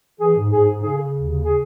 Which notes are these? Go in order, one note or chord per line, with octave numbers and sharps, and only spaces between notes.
E3 G#4
G#2
G#2 G#4
G#2
C#3 G#4
C#3
D#2
C#3
C#3 G#4